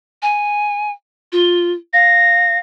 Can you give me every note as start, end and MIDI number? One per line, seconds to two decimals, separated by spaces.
0.22 0.91 80
1.32 1.72 65
1.93 2.60 77
1.93 2.58 94